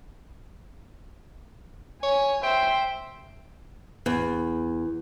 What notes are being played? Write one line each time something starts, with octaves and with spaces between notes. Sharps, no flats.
C#5 G#5
C5 E5 G5
E2